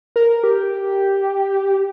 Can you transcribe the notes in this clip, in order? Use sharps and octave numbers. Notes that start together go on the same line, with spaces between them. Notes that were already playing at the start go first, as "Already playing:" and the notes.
A#4
G4